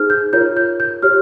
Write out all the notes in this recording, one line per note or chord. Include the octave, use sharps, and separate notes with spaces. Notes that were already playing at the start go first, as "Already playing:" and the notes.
Already playing: D#4 G#4 C5 F6
G6
F4 A#4 C#5 G6
G6
G6
G4 C#5 F6